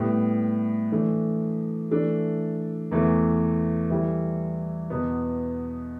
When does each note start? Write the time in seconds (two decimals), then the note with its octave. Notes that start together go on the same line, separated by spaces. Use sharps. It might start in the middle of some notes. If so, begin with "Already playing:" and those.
Already playing: A2 G3 B3 G4
0.92 E3 A3 D4
1.91 E3 A3 D4 A4
2.91 E2 E3 A3
3.90 E3 G3 E4 A4
4.90 E2 B2 B3